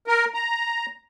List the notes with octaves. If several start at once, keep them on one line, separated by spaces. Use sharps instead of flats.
A#4
A#5